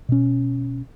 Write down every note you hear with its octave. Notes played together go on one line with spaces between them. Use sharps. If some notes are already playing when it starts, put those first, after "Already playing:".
B2 C#4